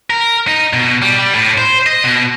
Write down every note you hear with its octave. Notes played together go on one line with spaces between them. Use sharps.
A#4
D#4
B2
G3
G3
A2
C5
D#5
B2